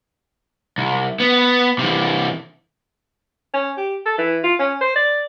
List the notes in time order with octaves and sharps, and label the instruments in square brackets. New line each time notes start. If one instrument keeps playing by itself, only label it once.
[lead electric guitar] C2
B3
C3 E3
[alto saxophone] C#4
G4
A4
E3
F4
C#4
C5
D5